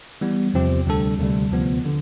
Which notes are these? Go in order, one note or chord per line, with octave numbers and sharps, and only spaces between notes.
E3 G3 B3
E2 C3 F3 C4 G4
D2 C3 G3 D4 A4
D2 C3 G3
D2 C3 F3 B3
D3